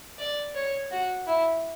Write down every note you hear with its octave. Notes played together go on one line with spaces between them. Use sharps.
D5
C#5
F#4
E4